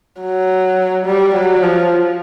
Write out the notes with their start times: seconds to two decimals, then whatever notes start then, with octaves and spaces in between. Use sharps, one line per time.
0.22 F#3
1.06 G3
1.34 F#3
1.63 F3